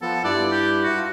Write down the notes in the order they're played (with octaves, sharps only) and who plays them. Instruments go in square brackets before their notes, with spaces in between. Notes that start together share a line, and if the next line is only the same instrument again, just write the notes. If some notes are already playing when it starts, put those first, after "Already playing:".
[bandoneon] F3 B3 [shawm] A4
[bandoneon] G2 E4 F#6 [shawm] D5
[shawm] G4
F#4
[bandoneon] F4